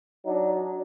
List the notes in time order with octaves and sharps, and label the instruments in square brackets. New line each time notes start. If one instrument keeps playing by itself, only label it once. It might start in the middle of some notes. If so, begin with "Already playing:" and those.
[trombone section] F#3 D4 D#4